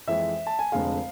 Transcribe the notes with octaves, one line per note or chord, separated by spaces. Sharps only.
F2 E3 G#3 C4 E5
A5
G#5
F1 F2 D3 G#3 F5